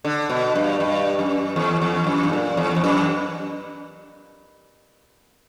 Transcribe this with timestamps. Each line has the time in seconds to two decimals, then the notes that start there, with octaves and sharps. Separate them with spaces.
0.05 D3
0.30 B2
0.56 G2
0.80 G2
1.19 F#2
1.56 E2
1.82 E2
2.07 F#2
2.23 G2
2.33 A#2
2.57 E2
2.76 E2
2.84 F#2